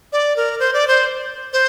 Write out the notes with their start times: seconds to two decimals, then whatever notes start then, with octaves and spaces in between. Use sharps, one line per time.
0.13 D5
0.37 A#4
0.60 C5
0.74 D5
0.88 C5
1.53 C5